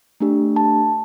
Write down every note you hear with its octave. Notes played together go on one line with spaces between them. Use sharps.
A3 D4 G4
A5